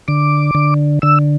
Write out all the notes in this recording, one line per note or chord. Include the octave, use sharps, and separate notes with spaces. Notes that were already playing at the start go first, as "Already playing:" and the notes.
D3 D6
D3
D3 E6